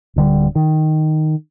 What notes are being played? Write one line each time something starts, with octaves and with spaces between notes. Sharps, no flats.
D1 D3 G3
D#3